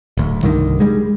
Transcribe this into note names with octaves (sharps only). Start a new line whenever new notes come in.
D1 D2
C2 G2 D3 D#3
G3 G#3